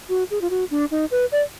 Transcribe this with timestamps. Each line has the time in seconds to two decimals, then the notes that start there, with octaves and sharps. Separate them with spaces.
0.09 F#4
0.31 G#4
0.41 F4
0.50 F#4
0.71 D4
0.91 D#4
1.11 B4
1.32 D5